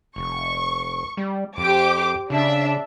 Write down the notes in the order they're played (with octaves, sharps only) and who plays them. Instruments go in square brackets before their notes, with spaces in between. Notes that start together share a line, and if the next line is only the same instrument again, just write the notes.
[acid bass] F1 [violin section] C#6
[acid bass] G3
[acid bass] F2 [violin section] G4 C5 D6
[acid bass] C#3 [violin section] D4 E5